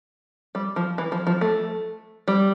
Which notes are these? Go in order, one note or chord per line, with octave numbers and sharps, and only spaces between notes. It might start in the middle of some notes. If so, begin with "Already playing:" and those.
G3
F3
E3
F3
F3
A3
G3